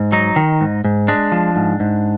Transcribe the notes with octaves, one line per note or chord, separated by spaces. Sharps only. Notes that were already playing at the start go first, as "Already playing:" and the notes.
Already playing: G#2
F#3 D#4
D#3
G#2
G#2
G#3 D4
F3
G#2
G#2